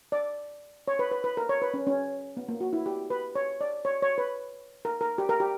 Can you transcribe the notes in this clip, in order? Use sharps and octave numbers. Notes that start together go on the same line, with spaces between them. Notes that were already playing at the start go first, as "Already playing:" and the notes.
D5
C#5
B4
B4
B4
A#4
C#5
B4
C#4
C#4
B3
A#3
F#4
E4
G4
B4
C#5
D5
C#5
C#5
B4
A#4
A#4
G4
A#4
G4